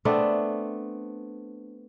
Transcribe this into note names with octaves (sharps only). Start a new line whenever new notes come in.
A3 B3 C4 D4